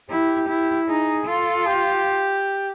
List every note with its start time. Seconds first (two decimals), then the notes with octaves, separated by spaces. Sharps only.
0.10 E4 G4
0.49 E4
0.89 D#4 G#4
1.27 F4 A4
1.66 G4